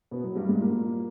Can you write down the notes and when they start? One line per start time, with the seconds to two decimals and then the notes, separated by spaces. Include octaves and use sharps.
0.11 B2 B3
0.24 F#3
0.36 G2 G3
0.49 G#2 G#3
0.60 A#2 A#3